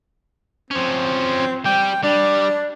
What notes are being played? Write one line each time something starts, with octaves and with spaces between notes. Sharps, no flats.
F3 C4 C#4
G3 G5
G3 D4